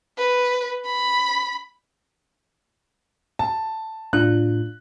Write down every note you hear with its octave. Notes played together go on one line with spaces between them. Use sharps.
B4
B5
A5
A2 D4 F4 F#6